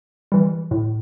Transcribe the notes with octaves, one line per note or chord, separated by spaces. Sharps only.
E3 G3
A2